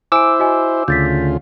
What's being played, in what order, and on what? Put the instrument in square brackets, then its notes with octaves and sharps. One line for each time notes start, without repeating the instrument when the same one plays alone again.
[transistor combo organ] E4 C5 [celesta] G#5 D7 [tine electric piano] D6 E6
[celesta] F#4 D#5 G#5
[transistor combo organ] D2 C#3 F4 [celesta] G6 A6 B6